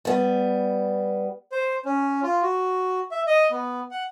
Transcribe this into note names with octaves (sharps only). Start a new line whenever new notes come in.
G3 B3
C5
C#4
F4
F#4
E5
D#5
B3
F#5